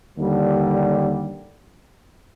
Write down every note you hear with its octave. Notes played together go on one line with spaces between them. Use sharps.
D#2 D3 G3